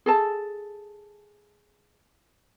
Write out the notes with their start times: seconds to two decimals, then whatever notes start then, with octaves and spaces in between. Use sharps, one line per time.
0.06 G#4 A4 A5